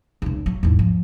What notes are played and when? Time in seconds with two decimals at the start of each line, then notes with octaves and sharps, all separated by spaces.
0.22 F1 C#2
0.46 F#3
0.63 E2 G#2
0.79 F3